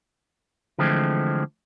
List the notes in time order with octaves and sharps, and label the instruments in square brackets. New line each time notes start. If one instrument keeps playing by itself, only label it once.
[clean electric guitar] D3 E3 F3 G#3 A3 C4